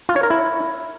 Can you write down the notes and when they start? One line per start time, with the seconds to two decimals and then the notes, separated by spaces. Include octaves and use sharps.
0.09 F4
0.16 C#5
0.23 A#4
0.30 E4